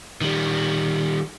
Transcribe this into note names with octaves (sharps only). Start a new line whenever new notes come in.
D#3 G3